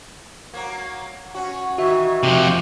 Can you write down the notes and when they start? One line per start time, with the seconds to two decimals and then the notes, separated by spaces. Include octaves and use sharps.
0.54 F#3 A#3
1.35 C#4 F#4
1.78 D#3 E3 F#4 E5
2.23 C3 F3